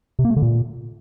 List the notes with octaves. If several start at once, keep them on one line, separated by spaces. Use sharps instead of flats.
C3
A#3
A3
D3
A#2